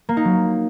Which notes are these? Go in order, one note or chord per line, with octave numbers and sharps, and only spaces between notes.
A#3
D#4
F#3